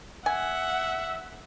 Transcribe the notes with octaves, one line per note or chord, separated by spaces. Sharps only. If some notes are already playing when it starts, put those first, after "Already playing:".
E5 F#5 G#5